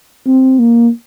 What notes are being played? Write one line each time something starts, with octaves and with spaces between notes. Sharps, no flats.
C4
A#3